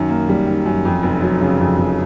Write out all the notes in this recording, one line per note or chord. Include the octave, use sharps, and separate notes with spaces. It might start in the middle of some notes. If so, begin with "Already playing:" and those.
Already playing: F#2 D#3
A#3
G3
D#3
F#2
F2
F1
F#3
C#3
F2
F1